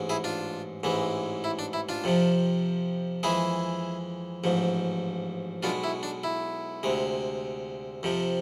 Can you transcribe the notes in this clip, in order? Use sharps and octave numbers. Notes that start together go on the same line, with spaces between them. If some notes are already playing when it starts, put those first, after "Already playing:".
Already playing: A1 G#2 G#3
E4 G#4
D4 F4
A1 G#2 E3 G#3
E4
D4
E4
D4 F4
F2 C3 F3
F2 E3 G#3 E4 G#4
A1 G#2 F3
B1 B2 G#3 D4 F4
E4
D4
E4
D2 C3 G#3
F2 C3 F3